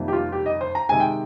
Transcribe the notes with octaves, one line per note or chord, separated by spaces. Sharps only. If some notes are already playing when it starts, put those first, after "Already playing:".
Already playing: F2 C3 D#3 G3 A#3
G4
F4
G4
D#5
C5
A#5
C3 D#3 G#3 G#5
G5